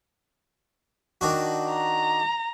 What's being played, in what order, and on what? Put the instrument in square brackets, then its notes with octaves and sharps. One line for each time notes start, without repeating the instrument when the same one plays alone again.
[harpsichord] D#3 D4 F#4
[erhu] A#5